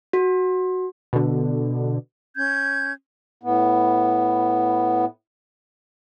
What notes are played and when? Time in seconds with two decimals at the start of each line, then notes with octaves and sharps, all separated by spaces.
0.13 F#4
1.13 B2 D3
2.35 C#4 G6 G#6
3.43 A2 B3